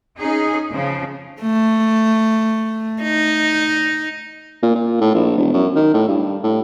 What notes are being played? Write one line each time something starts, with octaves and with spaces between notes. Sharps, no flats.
C#4 D#4 G#4
C#3 F3
A3
D#4
A#2
A#2
A2
A#1
E1
F#2
D#3
A2
G2
A2